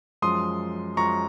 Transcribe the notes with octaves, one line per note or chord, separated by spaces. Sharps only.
F#2 F3 G#3 C6 D#6
F#2 F3 G#3 A#5 C#6